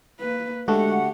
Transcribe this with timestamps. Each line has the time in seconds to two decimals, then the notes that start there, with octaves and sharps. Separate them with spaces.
0.20 A#3 B4
0.68 D3 G#3 A3 F#4 G4 F#5